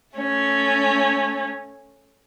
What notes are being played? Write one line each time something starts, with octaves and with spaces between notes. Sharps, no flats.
A3 C#4